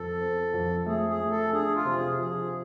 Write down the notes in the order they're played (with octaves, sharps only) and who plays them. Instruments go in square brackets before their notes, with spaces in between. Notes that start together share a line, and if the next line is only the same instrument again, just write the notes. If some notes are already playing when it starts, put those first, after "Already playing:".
Already playing: [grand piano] F2 [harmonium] A4
[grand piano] C4
F2
[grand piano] A3 [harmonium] G#4
[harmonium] G#4
[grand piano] A3
[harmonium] A4
[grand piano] D4 [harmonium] G#4
[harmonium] F4
[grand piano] C3
[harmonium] G#4
[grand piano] F3 [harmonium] G#4